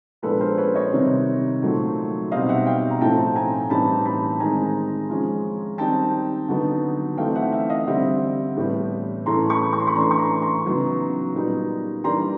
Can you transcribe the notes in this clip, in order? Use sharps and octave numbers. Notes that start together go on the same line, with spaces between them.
A#2 F3 G#3 B3 D4 A4 B4
A#4 C5
B4 C#5
C#5 D#5
C3 D#3 G3 C4 D#4
A#2 F#3 A3 C4 D#4
B2 G3 C4 D#4 D#5 F5
E5 F#5
F5 G5
A#5
A2 F3 A3 C4 D#4 G5 A5
G#5 A#5
A2 E3 G3 C4 D#4 A5 B5
A5 B5
D#3 G#3 C4 D#4 G#5 A#5
F3 G#3 C#4
D#3 G3 C4 D#4 G5 A5
D3 F#3 B3 D#4
E3 A3 C4 D#4 F5 G5
E5 F#5
E5 F#5
D#5 F5
D3 G3 C4 E5 F#5
A2 E3 G3 B3
A2 E3 A3 C#4 A#5 C6
B5 C#6
C#6
C6
B5 C#6
E3 A3 D4 A#5 C6
C#6
A#5 C6
A#5 C6
C#3 F#3 B3 D#4
A#2 G3 B3 D#4
E3 G3 A#3 D4 A#5 C6